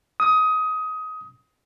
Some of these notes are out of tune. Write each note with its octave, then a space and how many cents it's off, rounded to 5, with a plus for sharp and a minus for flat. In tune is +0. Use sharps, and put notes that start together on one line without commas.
D#6 +20